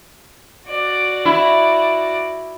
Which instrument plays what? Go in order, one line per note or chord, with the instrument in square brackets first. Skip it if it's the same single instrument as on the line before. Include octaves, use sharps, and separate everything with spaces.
[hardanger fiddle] F#4 D5
[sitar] E4